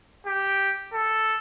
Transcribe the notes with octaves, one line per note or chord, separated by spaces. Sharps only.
G4
A4